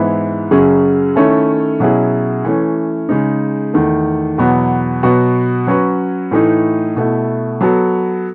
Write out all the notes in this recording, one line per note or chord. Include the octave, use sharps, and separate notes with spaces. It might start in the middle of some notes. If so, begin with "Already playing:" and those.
Already playing: G#2 E3 B3 E4
F#2 C#3 F#3 C#4 G#4
D#3 A3 C#4 E4 A4
B2 F#3 C#4 E4 G#4
E3 A3 C#4
C#3 G#3 D#4
E2 D#3 A3
E2 B2 F#3 B3
B2 F#3 B3 F#4 B4
F#3 C#4 F#4 B4
A2 E3 A3 D#4
B2 A3 E4
F#3 B3 F#4 A4